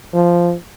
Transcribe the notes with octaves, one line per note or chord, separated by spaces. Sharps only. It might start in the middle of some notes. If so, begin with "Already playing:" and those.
F3